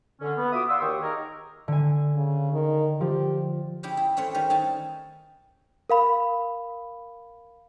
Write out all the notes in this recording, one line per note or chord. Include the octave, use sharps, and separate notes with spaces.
D3 C#4
B3
F4 F#4 E5 D6 D#6
D5 F5 F#5 C6 E6
D#2 D#3 G4 G5 C#6 D#6
D#4 G#4 A#4
D3 G#5
C#3
D#3
F3 G4
C#4 E4 G4 G#4
E4
A3 C4 C#4 E4
D#3 G3 C#4
D#4 A4 G#5 A5
A#4 F5 B5